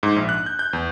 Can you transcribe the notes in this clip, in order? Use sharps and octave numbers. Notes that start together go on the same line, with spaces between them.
G#2
A#1
F#6
G6
G6
E2